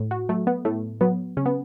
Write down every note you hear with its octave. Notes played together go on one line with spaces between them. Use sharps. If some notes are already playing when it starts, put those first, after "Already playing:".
Already playing: A2
F#4
F#3 A3
B3
A2 A3
F#3 B3
C#3 C#4
B3